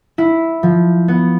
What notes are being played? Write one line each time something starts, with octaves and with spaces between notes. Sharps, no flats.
E4
F3
B3